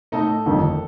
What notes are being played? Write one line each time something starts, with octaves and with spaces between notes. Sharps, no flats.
A2 A3 D#4 A4
G1 F2 D#3 A3